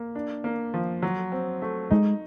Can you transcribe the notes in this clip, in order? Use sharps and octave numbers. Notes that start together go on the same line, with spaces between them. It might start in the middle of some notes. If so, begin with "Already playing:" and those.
Already playing: A#3
D4
A#3
F3
F#3
C4
A3
G#3 D#4